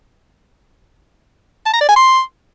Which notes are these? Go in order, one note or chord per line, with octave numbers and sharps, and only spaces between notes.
A5
A#5
D5
G#5
C6